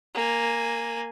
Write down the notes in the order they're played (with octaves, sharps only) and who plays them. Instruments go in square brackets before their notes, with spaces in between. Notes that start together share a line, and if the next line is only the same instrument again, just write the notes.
[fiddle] A#3 G#5